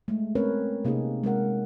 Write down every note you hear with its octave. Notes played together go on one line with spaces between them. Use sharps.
G#3 A3
A3 C4 C#4 A#4 B4 C#5
C3 A#3 C#4 D#4 G#4
G#3 C#4 A#4 F#5